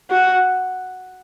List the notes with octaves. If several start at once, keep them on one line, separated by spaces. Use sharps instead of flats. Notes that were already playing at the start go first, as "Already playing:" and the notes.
F#4